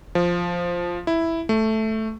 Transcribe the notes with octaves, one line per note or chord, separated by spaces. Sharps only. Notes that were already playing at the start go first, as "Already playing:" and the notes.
F3
E4
A3